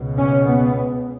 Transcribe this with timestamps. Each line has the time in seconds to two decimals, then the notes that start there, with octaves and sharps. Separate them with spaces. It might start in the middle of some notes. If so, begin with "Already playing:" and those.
Already playing: C#2 B2
0.17 C#4
0.45 B3